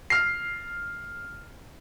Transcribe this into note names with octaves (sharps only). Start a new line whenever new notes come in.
F6 C7